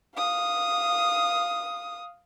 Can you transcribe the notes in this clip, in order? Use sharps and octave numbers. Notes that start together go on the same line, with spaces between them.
F5 D#6